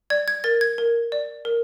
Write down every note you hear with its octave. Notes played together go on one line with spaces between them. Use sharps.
D5 G#6
G#6
A#4 A6
G#6
A#4
D5
A#4